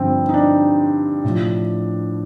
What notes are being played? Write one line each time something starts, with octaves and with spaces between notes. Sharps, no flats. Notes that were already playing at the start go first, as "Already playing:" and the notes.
Already playing: G2 D3 F3 C4 F4
D#4
D4
A2 F3